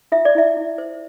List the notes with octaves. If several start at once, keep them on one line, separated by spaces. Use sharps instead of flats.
F4 E5
D5
E4 E5
E4
C5